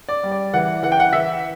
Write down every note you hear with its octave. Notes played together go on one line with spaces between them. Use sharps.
D5
G3
D5
E3 F#5
E3 F#5
G5
F#5
E3 E5